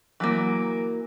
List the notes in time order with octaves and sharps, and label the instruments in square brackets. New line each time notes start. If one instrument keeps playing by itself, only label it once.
[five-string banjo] E3 F#3 A#3